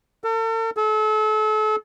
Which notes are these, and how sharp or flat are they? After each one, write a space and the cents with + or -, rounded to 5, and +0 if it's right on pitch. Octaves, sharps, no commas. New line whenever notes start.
A4 +45
A4 -35